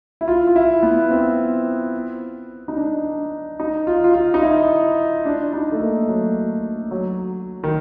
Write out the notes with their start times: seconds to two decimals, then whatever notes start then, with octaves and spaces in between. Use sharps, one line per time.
0.21 E4
0.28 F4
0.47 F4
0.56 E4
0.83 B3
1.11 C4
2.68 D#4
2.77 D4
3.60 D#4
3.87 F4
4.04 F4
4.14 F4
4.34 D#4
4.42 E4
5.25 D4
5.53 D#4
5.72 A3
5.80 A#3
6.08 F#3
6.91 F#3
7.64 D#3